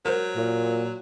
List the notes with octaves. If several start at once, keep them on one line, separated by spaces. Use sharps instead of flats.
F#3 A#4 C5
A#2